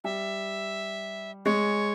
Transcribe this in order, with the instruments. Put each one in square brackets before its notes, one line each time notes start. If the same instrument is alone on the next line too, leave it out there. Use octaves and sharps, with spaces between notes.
[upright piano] G3 [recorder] E5
[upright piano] G#3 [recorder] C#5